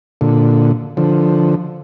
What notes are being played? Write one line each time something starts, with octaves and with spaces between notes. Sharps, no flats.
A#2 D3
D3 F3